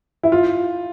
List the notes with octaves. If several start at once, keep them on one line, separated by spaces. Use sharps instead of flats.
E4
F4